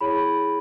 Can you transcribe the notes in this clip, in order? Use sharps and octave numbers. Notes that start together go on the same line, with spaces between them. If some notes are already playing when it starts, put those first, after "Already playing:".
E4 G#4 C#5 B5